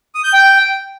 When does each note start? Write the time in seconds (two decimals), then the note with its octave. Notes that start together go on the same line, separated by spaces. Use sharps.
0.15 D#6
0.24 G6
0.33 G5